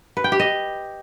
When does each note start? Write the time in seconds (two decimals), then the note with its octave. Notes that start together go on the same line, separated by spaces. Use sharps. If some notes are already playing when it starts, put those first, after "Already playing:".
0.17 B4
0.24 G5
0.32 G4
0.40 D#5